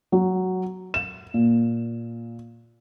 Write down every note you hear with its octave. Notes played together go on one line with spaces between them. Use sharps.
F#3
E7
A#2